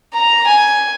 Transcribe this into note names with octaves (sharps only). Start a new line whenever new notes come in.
A#5
G#5